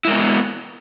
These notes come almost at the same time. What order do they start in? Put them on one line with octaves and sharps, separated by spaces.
E4 G#3 A#4 B3